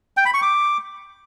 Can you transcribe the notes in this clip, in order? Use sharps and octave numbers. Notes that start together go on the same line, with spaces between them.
G5
B5
C#6
D6